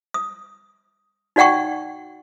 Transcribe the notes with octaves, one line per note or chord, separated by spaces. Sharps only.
D#6
D#4 F#4 D5 F#5 G5 C#6